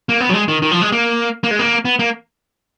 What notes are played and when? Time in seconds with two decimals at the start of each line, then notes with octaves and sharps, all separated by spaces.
0.09 A#3
0.20 B3
0.29 F#3
0.34 G#3
0.48 D#3
0.62 D#3
0.71 F3
0.82 G#3
0.92 A#3
1.44 A#3
1.51 G#3
1.59 A#3
1.85 B3
1.99 A#3